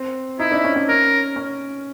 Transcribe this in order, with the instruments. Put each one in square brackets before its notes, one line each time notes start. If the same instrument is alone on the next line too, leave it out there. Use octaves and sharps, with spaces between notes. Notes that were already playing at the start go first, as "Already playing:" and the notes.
Already playing: [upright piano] C4
[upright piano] D#4 [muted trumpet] E4
[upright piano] D4
C#4
C#4
[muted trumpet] A#4
[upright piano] C#4